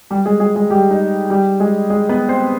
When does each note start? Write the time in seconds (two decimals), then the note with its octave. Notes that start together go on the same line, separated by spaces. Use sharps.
0.10 G3 G4
0.26 G#3 G#4
0.40 G#3 G#4
0.55 G#3 G#4
0.70 G3 G4
0.91 D#4
1.30 G3 G4
1.60 G#3 G#4
1.90 G#3 G#4
2.09 B3 B4
2.29 C4 C5